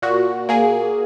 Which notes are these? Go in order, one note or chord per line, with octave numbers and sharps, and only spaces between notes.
A#2 F#4
A#3 G#4